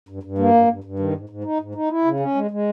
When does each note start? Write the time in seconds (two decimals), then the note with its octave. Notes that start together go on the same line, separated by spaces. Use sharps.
0.09 G2
0.23 G2
0.38 A#3
0.54 G2
0.68 G2
0.84 G2
0.99 D#3
1.14 G#2
1.29 G#2
1.44 D#4
1.60 G#2
1.75 D#4
1.89 E4
2.05 C#3
2.20 C#4
2.35 G#3
2.51 G#3